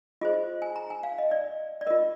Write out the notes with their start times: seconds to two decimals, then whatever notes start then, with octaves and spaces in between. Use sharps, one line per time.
0.21 F4 G#4 C5 D#5
0.62 G#5
0.76 A#5
0.90 G#5
1.03 F5
1.18 D#5
1.31 D5
1.81 D5
1.86 A#4 D#5
1.90 F4